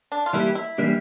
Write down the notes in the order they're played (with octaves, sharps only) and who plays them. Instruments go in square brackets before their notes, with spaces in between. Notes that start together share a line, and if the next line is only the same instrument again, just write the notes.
[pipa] D4
F4
[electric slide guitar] E3 G3 A#3 D4 G4 [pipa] E4
[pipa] E4
[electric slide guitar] E3 G3 A#3 D4 G4